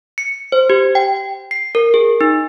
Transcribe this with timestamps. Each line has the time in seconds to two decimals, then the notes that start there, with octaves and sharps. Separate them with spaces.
0.18 C#7
0.52 C5
0.70 G4
0.95 G5
1.51 C7
1.75 A#4
1.94 G#4
2.21 D#4